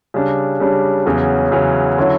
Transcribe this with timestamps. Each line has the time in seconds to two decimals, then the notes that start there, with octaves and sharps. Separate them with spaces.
0.14 C#3 G3 D4
0.60 C#3 G3 D4
1.06 E2 C#3 F#3 C#4
1.51 E2 C#3 F#3 C#4
1.98 D3 F#3 C#4 E4